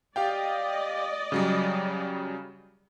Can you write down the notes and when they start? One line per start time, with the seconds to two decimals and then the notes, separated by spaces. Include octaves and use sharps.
0.16 G4 D5 D#5 F5 G5
1.32 C#3 F#3 G3